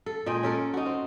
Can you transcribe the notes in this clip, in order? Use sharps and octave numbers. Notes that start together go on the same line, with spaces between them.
A4
A#2 G#3 D#5 G5
C#4 A4 A#4
D#4 F#4
C4